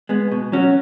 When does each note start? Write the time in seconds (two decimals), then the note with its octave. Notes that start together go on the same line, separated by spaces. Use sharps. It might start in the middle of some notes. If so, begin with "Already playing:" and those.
0.09 G#3 B3
0.32 B2
0.52 F#3 C#4 F#4